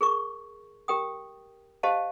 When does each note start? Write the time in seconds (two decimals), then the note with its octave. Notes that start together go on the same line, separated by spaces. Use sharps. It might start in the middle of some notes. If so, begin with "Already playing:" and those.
0.01 G#4 A#4 C#6
0.88 G4 A#4 G5 D#6
1.83 G4 C5 D#5 F5 A5